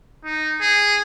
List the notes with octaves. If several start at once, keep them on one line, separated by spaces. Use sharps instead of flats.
D#4
G#4